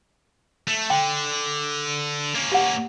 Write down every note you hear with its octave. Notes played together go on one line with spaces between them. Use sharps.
A3
D3 G5
A#3 C#4
G4 F#5